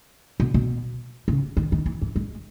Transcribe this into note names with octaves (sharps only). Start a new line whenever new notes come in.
B2
B2
C#3
D#3
D#3
E3
E3
G#3